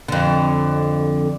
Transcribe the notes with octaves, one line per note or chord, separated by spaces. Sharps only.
F2 D3